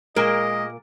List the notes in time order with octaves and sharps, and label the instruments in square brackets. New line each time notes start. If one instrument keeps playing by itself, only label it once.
[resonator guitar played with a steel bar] A#2 A#4 [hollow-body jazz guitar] G#3 [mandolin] A#3 [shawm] D#5